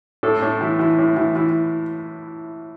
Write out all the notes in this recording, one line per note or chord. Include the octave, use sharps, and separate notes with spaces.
A2 A4
A2
E3
E3
A2
E3
E3